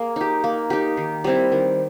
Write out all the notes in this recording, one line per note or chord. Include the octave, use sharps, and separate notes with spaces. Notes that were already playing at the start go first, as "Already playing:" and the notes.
Already playing: A#3 G#4
D#4 G4
A#3
D#4 G4
D#3
G3 C4 E4
D#3